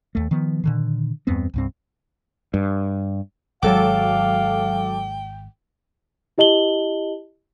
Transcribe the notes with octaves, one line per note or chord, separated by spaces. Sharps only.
D#2 A3
D#3 F3 B3
A#2 D3 D#3
E2 G2 B3 C4
C2 G2 C4
G2
G#1 F#3 G#3 A4 F5 G5 D6
E4 G4 D#5 A5 F#7 G7